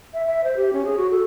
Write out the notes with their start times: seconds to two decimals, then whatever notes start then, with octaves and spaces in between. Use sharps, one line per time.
0.14 E5
0.27 E5
0.44 C5
0.57 G4
0.73 C#4
0.85 G#4
0.97 F#4
1.12 A4